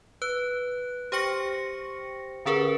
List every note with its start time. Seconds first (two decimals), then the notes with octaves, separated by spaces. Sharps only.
0.22 B4 F#6
1.12 G4 C5 G5 C#6 A#6 C#7
2.45 D3 C#4 G#4 A#4 B4